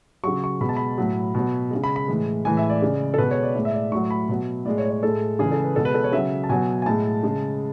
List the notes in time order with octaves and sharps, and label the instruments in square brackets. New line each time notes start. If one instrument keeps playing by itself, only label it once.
[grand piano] C#3 F#3 C#6
C#6
B2 G#3 B5
A5
B5
A2 F#3
B2 F#3
C#3 G#3
B5
B5
A2 E3 G#3
A2 E3 G#3 G#5
E5
D5
C#3 G#3
A4
B2 G#3 B4
C#5
D5
A2 G#3 D5
E5
D5
A2 F#3 C#6
B5
B2 F#3
A2 G#3 D5
C#5
C#5
A2 G#3 A4
C#3 E3 G#3 G#4
A4
B4
B2 G#3 A4
B4
A4
C#5
C#3 F#3 E5
A5
B2 F#3 G#5
G#5
A2 G#3 A5
C#3 G#3